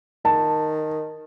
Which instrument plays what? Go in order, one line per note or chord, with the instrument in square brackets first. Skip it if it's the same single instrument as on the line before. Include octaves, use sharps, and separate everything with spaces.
[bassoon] D#3 [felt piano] A5